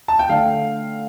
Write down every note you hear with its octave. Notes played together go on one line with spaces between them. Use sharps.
A5
G5
D3 A3 F5